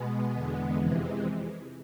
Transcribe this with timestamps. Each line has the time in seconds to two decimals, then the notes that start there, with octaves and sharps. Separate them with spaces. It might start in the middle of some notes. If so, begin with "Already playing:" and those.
Already playing: B2 G#3 B3
0.34 E2 D3 G#3
0.80 F2 C3 E3 G#3